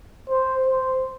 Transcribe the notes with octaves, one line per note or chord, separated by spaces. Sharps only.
C5
C5